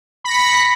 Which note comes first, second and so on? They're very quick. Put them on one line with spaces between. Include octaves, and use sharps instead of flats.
B5 A#6 C#7 B6